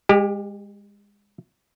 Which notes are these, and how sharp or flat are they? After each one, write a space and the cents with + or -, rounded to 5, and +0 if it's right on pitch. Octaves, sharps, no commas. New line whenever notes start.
G#3 -30 G4 +15